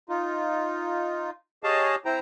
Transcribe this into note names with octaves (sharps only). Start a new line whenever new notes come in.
D#4 F4
G4 G#4 C#5 D#5 F5 A5
C4 E4 C5 G5 A#5